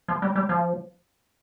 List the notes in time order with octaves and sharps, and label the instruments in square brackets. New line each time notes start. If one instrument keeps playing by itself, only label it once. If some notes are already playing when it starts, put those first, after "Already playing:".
[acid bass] F3
G3
G3
F3